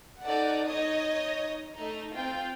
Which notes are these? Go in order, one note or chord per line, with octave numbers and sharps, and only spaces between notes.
D#4 A4 D5 F#5
D#4 C#5 D#5 D#6
A3 D#4
C4 F4 G5